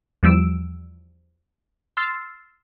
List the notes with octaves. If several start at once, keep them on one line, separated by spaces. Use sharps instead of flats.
E2 F3 G3 E6 D7
C6 E6 F6 A6 C7